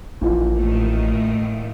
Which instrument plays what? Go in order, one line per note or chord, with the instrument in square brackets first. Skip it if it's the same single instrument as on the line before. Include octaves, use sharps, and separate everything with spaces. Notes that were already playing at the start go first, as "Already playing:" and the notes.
[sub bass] A1 [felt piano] A#2 E3 F3
[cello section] A2 D#3 A3